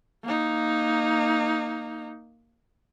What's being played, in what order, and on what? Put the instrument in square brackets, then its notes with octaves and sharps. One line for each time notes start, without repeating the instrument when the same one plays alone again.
[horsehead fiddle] A#3 D#4